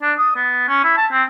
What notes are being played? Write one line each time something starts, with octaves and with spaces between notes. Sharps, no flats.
D4
D#6
B3
C#4
E4
A5
C4